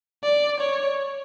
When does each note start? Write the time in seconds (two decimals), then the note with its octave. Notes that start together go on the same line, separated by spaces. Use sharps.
0.24 D5
0.61 C#5